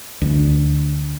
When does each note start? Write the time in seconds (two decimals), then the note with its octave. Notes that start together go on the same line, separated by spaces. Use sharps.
0.22 D2